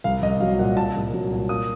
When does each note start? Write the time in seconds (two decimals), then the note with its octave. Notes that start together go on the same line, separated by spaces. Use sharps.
0.04 C2 F5
0.22 C2 D#5
0.40 F#3 F5
0.59 A#2 F#5
0.77 A#2 A5
0.95 C2
1.13 F#3
1.31 A#2
1.49 A#3 D#6